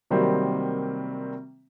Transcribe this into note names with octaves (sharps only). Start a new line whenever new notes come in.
C3 D#3 F#3 G3 A#3 C4